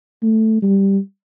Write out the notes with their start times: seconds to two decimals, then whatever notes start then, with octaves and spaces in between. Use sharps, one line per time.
0.23 A3
0.62 G3